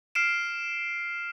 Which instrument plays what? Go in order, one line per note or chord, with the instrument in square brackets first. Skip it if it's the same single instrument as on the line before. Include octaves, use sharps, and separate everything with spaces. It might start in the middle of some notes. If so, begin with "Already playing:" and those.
[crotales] F6 C7 D7 E7